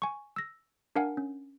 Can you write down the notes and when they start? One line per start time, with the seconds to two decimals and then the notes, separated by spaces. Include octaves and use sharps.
0.02 G#5 C#6
0.36 E6 A#6
0.96 D4 A#4 F5 F#5 G#5
1.17 C#4